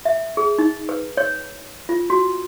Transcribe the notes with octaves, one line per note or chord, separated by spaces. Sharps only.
E5
G#4
D#4
B4
C#5
F4
F#4